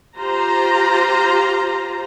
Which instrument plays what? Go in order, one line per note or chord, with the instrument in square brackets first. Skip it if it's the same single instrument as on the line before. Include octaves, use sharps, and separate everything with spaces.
[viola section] F4 G4 C5 A#5